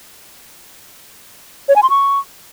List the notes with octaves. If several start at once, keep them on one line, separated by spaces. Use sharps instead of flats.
C#5
G#5
C6
C#6